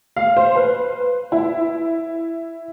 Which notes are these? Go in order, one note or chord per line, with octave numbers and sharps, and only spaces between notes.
F5
C5
B4
E4